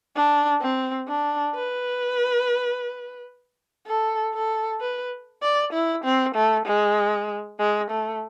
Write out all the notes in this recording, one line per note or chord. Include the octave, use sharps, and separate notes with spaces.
D4
C4
D4
B4
A4
A4
B4
D5
E4
C4
A3
G#3
G#3
A3